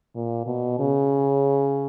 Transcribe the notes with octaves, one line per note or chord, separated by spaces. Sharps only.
A#2
B2
C#3